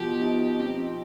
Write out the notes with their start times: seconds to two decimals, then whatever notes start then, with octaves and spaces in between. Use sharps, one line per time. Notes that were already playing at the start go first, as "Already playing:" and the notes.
Already playing: B2 F3 G4
0.22 D#4
0.60 C4